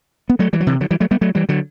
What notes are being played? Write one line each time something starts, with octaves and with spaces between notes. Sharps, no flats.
B3
F#3 A3
E3 G3
F#3
C3 E3
D3 F#3
E3 G3
F#3 A3
G3 B3
F#3 A3
E3 G3
D3 F#3